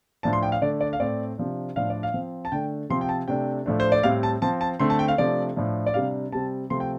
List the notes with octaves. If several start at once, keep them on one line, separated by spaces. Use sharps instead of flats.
A2 F3 D4 A5
C6
G5
F5
D3 A3 D4 D5
D5
F5
A2 A3 C4 D5
C3 F3 D4
A2 F3 D4 F5
D5
F5
F3 C4
A5
D3 A3 D4 G5
C3 F3 C4 C6
G5
A5
C3 A3 D4 G5
A2 F3 A3 D4
C5
D5
A2 G3 C4 F5
A5
F3 C4 A5
A5
D3 A3 C4 C6
A5
G5
F5
C3 F3 A3 D4 D5
A2 F3 D4
D5
C3 G3 D4 F5
C3 G3 C4 A5
C3 F3 A3 C4 C6
G5